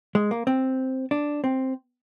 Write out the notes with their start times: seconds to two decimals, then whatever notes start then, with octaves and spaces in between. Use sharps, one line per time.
0.15 G#3
0.31 A#3
0.47 C4
1.11 D4
1.44 C4